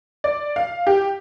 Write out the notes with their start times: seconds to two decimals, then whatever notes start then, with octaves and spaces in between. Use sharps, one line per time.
0.24 D5
0.56 F5
0.87 G4